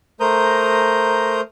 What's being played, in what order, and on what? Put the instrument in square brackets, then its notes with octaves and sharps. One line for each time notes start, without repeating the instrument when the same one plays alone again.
[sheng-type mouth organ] A3 A#4 C5 A#5 D#6 G6